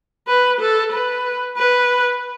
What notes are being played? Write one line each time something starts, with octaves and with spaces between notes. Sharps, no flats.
B4
A4
B4
B4